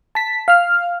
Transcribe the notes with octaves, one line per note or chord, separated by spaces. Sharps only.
A5 B6
F5 F6